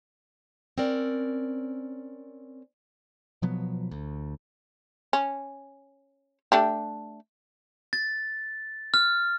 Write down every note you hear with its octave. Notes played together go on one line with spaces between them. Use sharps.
C4 C#4 A#4 D5
B2 F3 F#3 B3
D2
C#4
A3 D4 G4
A6
F6